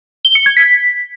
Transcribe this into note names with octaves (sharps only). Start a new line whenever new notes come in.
G7
C#7
G#6
B6